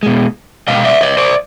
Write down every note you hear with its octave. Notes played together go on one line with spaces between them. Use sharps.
B2 G#3
B2 G#3 D#5 F5
D5 E5
C#5 D#5
C5 D5